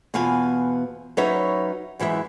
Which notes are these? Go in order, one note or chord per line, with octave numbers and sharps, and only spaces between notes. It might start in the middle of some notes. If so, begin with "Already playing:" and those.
E2 B2 F4 F5 G#5
F#3 C#4 D#4 B4 C#5 E5
F#2 E3 G#3 E5